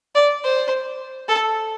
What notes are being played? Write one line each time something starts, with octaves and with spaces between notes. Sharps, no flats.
D5
C5
A4